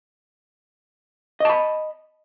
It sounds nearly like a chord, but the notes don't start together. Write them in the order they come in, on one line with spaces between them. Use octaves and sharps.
D#5 A5 B5